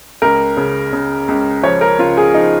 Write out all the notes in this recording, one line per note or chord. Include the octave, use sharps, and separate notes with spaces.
C#2 A#4
C#3
C#3
C#2
F3 C#5
A#4
C#3 F4
G#4
F3 D#4